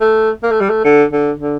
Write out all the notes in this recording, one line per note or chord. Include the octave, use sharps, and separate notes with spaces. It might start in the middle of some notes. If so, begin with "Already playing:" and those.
A3
A#3
A3
G3
A3
D3
D3
D3